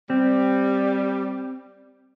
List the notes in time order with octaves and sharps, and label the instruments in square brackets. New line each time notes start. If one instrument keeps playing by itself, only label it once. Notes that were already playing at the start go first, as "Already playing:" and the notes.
[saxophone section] G3 [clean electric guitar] C4